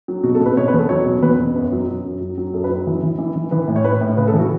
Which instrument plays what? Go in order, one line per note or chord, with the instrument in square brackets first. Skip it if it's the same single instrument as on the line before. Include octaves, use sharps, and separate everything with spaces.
[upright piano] F#3
B2 F#4
A4
B2
B4
B2 C#5
B4
E2 A4
F#3 C#5
B2
E2 B4
B2
F#2 B4
F#3
F#3
F#2
F#3
F#3
F#2 A4
B4
F#3
E3
E3
E3
E3
E3 B4
A2
C#5
A2 B4
A2
C#3 B4
A4
E3
F#4